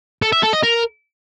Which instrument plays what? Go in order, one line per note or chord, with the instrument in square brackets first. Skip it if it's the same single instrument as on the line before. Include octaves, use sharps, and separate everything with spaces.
[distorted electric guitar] A4
E5
A4
D#5
A#4